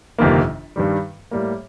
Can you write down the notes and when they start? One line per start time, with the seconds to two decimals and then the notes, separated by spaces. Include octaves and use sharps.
0.18 G1 F2 C3 D#3 A#3
0.76 G2 D#3 G3
1.31 A2 G3 A#3